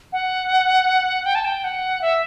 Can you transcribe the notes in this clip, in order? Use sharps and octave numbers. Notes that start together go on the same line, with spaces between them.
F#5
G5
A5
G5
F#5
E5